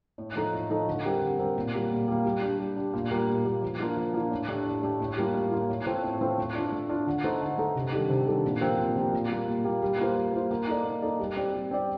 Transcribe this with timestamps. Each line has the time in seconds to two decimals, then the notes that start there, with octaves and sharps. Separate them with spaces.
0.18 A2
0.36 F3 A3 D#4 A4
0.53 A2
0.70 F3 A3 D#4 A4
0.87 D3
1.05 G3 C4 G4 A#4
1.22 D3
1.39 G3 C4 G4 A#4
1.56 A#2
1.73 G3 A#3
1.90 A#2
2.08 G3 A#3
2.25 G3
2.42 D4 G4
2.59 G3
2.76 D4 G4
2.93 A#2
3.11 G3 A#3
3.28 A#2
3.45 G3 A#3
3.62 F3
3.80 A#3 D4 F4
3.97 F3
4.14 A#3 D4 F4
4.31 A2
4.48 A3 D4 G4
4.66 A2
4.83 A3 D4 G4
5.00 A2
5.17 G3 A#3 F4
5.34 A2
5.52 G3 A#3 F4
5.69 A2
5.86 A3 C4 F4 C5
6.03 A2
6.21 A3 C4 F4 C5
6.38 A3
6.55 D4 F4
6.72 A3
6.89 D4 F4
7.07 D3
7.24 A3 D#4 A4 C5
7.41 D3
7.58 A3 D#4 A4 C5
7.75 C3
7.92 D#3 G3 D4 A4
8.09 C3
8.27 D#3 G3 D4 A4
8.44 A#2
8.61 F3 C4 G4 A#4
8.79 A#2
8.96 F3 C4 G4 A#4
9.13 A#2
9.31 G3 A#3
9.48 A#2
9.64 G3 A#3
9.82 G3
9.99 A#3 F4 C5
10.16 G3
10.33 A#3 F4 C5
10.51 A#3
10.67 D#4 A4 D5
10.85 A#3
11.02 D#4 A4 D5
11.19 G3
11.36 C4 G4 D5
11.54 G3
11.71 C4 G4 D5